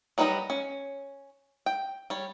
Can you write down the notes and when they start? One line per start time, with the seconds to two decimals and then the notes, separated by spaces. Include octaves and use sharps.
0.18 F#3 G3 D#4 B4 D#5
0.50 C#4
1.66 G5
2.10 G3 C#5